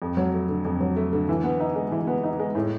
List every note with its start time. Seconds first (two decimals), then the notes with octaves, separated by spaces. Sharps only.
0.02 F2
0.17 F#3
0.34 A3
0.49 D3
0.65 F2
0.81 F#3
0.96 A3
1.13 D3
1.29 E3
1.44 B3
1.60 D#4
1.75 G#3
1.92 E3
2.07 B3
2.24 D#4
2.40 G#3
2.55 A2